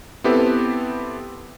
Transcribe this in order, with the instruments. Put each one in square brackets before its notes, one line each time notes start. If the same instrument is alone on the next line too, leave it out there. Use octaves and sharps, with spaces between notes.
[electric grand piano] B3 C4 E4 G4 A4 B4